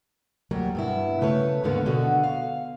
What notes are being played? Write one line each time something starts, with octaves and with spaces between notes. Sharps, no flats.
D2 F#3 G3 A#3
G2 B2 E4
C#3 A3 B4 C#5
D#2 G#2 D3 A#3 B3 B4
B2 D3 F#4
F5